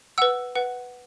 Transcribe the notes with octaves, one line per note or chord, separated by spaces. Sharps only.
B4 F#5 E6
B4 F#5